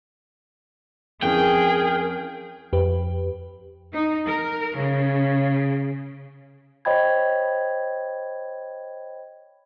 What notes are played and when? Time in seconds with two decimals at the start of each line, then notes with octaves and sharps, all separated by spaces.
1.22 F2 E3 C#4 G#4 A#4 G5
2.73 F2 G4 B4
3.93 D#4
4.26 A#4
4.77 C#3
6.85 C5 C#5 D#5 G5 B5 G#6